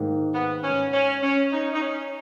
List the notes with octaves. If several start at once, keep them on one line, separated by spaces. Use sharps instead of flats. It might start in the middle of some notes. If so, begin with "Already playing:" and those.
Already playing: G#2 D#3 A#3
B3
C#4
C#4
C#4
D#4
D#4
C#4